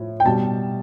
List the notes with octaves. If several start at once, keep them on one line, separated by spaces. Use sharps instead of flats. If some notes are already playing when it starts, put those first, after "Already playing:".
Already playing: A2 F3
G5
B2 G3 A5